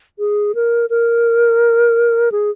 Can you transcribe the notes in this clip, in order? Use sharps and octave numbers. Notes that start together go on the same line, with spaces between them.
G#4
A#4
A#4
G#4